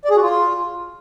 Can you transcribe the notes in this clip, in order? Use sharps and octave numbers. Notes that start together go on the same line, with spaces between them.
D5
G#4
F#4
F4